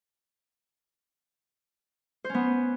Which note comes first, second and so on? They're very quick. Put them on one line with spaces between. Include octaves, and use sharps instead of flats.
C5 C#4 B3